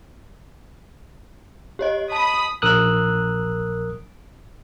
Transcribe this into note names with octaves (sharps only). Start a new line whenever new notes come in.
G4 C#5 D#5
A5 B5 D#6
A#1 A#4 D#6 E6 F#6